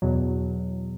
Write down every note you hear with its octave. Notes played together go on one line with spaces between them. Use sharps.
E2 B2 F#3